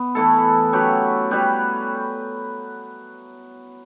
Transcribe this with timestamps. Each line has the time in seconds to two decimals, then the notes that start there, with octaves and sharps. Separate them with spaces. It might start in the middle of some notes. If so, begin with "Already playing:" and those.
Already playing: B3
0.15 E3 A3 E4 A4
0.73 F#3 C#4 G4 B4
1.31 G3 C#4 G4 B4